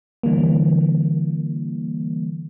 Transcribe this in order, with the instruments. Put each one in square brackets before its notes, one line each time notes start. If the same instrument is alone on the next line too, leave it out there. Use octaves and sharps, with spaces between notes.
[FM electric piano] D3 E3 G3 A#3